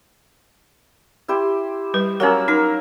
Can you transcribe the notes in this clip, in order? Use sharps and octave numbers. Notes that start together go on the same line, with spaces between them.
E4 G4 C5
G3 B4
F#3 A#3 C#4 A#4 E6
D#4 A#4